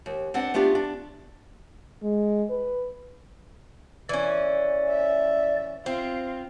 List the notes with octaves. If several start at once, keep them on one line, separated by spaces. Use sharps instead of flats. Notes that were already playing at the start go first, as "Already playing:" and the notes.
D#2
C4 D4 B4 F#5
A3 B3 D4 F4 G4
D4
G#3
B4
E3 C#4 D5
E5
C4 F4